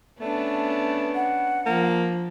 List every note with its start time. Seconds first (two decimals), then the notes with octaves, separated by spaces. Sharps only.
0.21 A3 B3 C#4 D4
1.15 F#5
1.66 F3 A#3